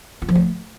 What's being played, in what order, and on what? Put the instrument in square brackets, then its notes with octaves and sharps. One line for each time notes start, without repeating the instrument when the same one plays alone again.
[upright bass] F4
F3
A3